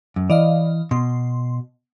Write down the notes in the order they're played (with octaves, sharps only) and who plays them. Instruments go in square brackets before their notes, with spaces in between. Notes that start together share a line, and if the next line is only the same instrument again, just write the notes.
[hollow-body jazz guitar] F#2
[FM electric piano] E3 D#5 F5 [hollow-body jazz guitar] D5
[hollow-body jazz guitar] B2 [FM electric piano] C6